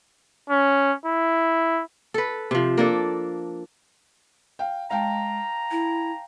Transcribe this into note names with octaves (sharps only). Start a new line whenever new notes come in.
C#4
E4
A4 B4
C3 F3
A#3 D4 A4
F5 G5
G#3 F5 G5 A5 A#5
E4